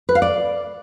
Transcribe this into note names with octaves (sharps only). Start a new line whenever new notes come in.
B4
F5
D5